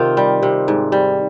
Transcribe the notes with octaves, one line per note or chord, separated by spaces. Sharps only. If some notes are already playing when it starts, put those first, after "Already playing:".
Already playing: C3 D#3 F4
G3
C3
G#2
G3